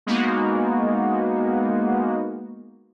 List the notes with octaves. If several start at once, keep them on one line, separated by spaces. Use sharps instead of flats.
G#3 A#3 B3 D#4 F#4